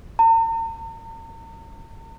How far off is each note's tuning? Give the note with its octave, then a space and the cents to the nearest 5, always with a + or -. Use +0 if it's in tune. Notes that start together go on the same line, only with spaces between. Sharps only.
A#5 -45